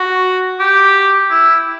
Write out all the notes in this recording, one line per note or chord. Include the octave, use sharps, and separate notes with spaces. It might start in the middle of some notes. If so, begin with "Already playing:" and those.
Already playing: F#4
G4
E4